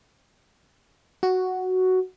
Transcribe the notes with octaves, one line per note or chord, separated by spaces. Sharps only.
F#4